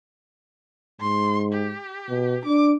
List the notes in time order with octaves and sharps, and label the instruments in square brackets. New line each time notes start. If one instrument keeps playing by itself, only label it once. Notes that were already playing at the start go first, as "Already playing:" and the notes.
[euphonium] G#2 [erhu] C6
[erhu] G4
[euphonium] B2
[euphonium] D4 [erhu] D6